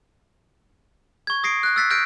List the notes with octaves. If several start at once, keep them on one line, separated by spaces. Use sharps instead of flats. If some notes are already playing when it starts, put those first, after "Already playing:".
C#6 G#6
D#6 A#6 C7 D7
F#6
E6 F#6 G6 A6 B6 C7
F6 G6 A#6 D7